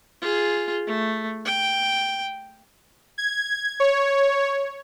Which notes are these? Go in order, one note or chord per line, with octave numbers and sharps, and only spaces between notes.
F4 G#4
A3
G5
G#6
C#5